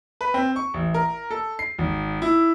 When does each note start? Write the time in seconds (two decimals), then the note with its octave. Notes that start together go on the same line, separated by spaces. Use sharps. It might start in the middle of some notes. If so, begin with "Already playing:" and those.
0.21 B4
0.34 C4
0.56 C#6
0.74 A1
0.94 A#4
1.31 A4
1.59 C7
1.78 G#1
2.22 E4